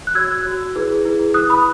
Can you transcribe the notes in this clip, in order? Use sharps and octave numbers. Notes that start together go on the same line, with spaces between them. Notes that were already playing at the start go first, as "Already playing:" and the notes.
F#6
F#4 C#5 E6 G#6
F#4 C#5
E4 G#4 B4
E4 G#4 B4
E4 B4 D#6 F#6
B5 D#6